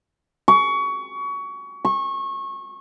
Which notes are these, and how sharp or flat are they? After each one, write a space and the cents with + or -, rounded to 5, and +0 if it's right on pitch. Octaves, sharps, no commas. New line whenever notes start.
C#6 +25
C#6 -25